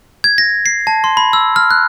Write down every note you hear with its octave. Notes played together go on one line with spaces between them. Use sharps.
G#6
A#6
C7
A5
C6
B5
E6
F6
F#6